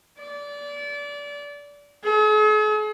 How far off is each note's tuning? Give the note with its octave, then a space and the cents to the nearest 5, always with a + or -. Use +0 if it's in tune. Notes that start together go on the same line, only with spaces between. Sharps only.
D5 -25
G#4 +45